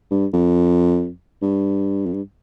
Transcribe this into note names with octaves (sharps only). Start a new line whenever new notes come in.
G2
F2
G2
F2
G2